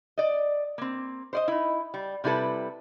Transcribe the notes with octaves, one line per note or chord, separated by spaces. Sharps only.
D5 D#5
A#3 C4
C5 D5 D#5
D#4 E4
G3
C3 G3 E4 A4 B4